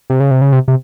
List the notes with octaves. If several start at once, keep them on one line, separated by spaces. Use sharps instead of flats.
C3
C#3
C3
C#3
C3
C3